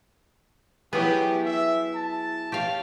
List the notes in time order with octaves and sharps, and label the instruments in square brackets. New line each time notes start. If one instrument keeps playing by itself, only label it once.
[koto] F#3 B3 [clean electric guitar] E4 G#4 [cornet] G4
[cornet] E5
A5
[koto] G4 C#5 F5